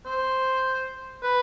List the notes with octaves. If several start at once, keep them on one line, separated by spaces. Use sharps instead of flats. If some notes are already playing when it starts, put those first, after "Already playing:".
C5
B4